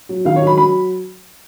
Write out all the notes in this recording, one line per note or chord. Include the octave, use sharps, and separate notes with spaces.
F#3
D#3 F5
C#5
F#3 B5
F#3 B5